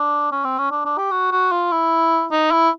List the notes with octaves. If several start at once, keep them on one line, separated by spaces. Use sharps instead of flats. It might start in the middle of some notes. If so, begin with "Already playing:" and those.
Already playing: D4
C#4
C4
C#4
D4
D4
G4
F#4
F#4
F4
E4
D#4
E4